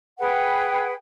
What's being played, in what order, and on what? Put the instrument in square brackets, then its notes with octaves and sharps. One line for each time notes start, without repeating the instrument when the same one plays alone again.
[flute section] G#4 B4 F#5 G5